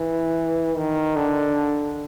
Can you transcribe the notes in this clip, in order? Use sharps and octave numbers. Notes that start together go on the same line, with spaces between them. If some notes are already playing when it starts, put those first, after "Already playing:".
Already playing: E3
D#3
D3